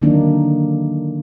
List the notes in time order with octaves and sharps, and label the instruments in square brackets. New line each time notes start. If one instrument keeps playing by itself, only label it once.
[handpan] D3 D#3 F#3 A#3 D4 D#4